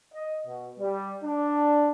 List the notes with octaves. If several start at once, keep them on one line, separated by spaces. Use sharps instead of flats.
D#5
B2
G3
D4